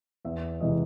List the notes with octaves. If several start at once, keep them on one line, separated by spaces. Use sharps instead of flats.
E2 E5
C3 E3 G#3 D#5